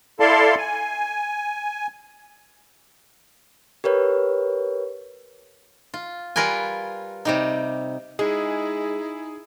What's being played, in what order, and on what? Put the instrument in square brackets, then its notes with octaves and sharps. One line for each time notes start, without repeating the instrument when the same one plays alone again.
[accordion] E4 A4 D5 F5 A5 C6
G#5
[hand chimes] G4 A#4 B4 C#5
[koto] F4
G3 F4 A#4 B4 G#5
C3 G3 D#4
[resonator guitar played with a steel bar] G#3 [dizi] D#4 [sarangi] E4 [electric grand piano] G#4